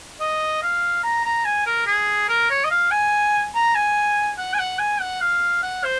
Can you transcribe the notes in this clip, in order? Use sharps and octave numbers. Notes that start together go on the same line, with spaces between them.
D#5
F5
A#5
A#5
G#5
A#4
G#4
A#4
C#5
D#5
F5
G#5
A#5
G#5
F#5
G#5
F#5
G#5
F#5
F5
F#5
C5